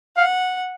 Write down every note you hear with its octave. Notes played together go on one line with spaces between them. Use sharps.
F5 F#5